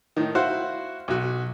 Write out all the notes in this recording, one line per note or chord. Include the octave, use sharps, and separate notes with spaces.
A2 D#3
E4 F#4 C5 F5 F#5
B1 F#4